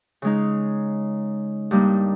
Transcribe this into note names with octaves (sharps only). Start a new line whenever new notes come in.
C#3 G#3 D#4
G2 G3 A#3 D#4